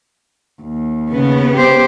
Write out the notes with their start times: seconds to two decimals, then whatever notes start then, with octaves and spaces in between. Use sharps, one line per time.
0.62 D#2
1.12 C#3 B3
1.55 G4 C5